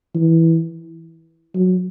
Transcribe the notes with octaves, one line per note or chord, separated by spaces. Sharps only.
E3
F#3